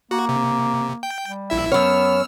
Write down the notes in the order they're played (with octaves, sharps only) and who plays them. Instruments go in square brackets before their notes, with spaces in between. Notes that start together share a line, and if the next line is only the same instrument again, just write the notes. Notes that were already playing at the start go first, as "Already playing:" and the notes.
[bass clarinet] A#3 [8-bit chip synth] F#4
[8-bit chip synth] C3
G5
[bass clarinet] G3
[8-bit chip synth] A#1 E4 E5
[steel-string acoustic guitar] F#2 C#5 [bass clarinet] B3 [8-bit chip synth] E6 F6